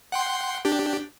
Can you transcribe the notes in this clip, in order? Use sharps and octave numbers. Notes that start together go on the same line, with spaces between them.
F#5 G5 C6
D4 G4